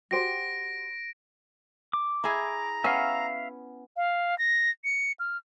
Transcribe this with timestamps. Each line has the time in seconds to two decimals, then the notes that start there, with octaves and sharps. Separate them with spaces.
0.11 F#4 G4 C5 A#6 D7
1.93 D6
2.24 E4 G#4 A#5
2.84 B3 C#4 E5 F5
3.97 F5
4.38 A#6
4.84 C#7
5.20 F6